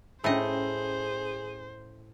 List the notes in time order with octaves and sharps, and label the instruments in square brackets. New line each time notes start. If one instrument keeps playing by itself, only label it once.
[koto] A2 D#5 [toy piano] C#4 G5 E6 [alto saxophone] G#4 [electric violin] C5